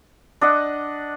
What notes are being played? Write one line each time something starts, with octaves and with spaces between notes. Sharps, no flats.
D4 D#5 F#5